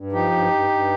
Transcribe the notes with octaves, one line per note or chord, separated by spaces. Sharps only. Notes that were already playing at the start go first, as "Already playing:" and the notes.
Already playing: G2
F3 D#4 G4
G2
G2
G2